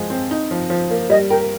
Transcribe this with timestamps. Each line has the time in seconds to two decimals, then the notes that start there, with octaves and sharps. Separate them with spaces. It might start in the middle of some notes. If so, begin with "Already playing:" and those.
Already playing: F3 G#3
0.10 C4
0.31 D#4
0.51 F3
0.70 F3
0.90 A#3
1.10 G3 D#5
1.29 A#4 G5